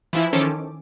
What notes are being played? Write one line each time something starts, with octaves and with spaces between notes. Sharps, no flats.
E3 F3 E4
D#3 C#4 A4 C5 D6